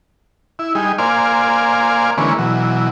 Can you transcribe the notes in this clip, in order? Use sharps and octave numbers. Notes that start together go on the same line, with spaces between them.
E4
G3 D#4 G#4
A#3 C5 D5 F5 G#5
D3 E3 G#3 A#3 B3 C#4
B2 E3 F#3